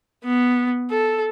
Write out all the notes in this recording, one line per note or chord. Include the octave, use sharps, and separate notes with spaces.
B3
A4